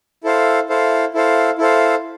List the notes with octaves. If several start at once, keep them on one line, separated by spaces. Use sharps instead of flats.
E4 A4 C5 F5
E4 A4 C5 F5
E4 A4 C5 F5
E4 A4 C5 F5